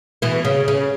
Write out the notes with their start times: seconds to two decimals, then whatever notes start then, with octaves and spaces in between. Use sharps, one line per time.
0.22 B2 E3
0.45 C#3
0.68 C#3